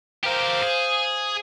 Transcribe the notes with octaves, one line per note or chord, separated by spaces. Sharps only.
G4 A#4 C5 F5
G#4